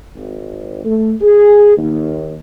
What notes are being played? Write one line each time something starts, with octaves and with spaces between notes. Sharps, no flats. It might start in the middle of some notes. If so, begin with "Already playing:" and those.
G#1
A3
G#4
D#2